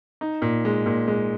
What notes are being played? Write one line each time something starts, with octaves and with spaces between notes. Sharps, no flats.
D#4
A#2
G#3
A#2
G#3